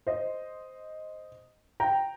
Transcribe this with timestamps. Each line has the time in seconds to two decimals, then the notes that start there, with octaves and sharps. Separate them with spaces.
0.07 C5 D#5
1.80 G5 A#5